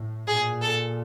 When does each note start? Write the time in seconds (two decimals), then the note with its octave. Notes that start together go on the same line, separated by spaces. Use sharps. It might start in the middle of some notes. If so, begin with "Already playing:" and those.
Already playing: A2
0.27 A#2 G#4
0.61 A4